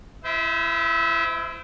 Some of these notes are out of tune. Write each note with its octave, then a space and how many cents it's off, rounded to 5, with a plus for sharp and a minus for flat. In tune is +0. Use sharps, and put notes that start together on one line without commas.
E4 +30 C5 -30 E5 -30